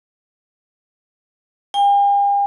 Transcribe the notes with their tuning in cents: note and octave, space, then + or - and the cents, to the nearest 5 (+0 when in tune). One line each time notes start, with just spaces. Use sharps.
G5 +45